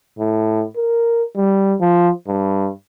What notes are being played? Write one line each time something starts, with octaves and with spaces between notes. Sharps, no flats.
A2
A#4
G3
F3
G2